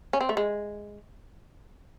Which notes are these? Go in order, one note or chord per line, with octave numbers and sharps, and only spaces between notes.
C#4
C4
A3
G#3